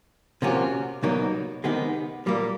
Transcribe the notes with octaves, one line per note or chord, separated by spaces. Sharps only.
C3 F3 A#3 C#4 F#4
C2 B2 F#3 A#3 D#4
C3 D#3 G#3 B3
A#2 G3 A#3